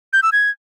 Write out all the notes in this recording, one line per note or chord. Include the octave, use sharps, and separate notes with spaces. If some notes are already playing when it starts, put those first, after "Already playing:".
G6
E6
G#6